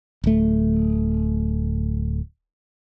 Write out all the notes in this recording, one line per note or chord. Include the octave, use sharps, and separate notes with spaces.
D1 A3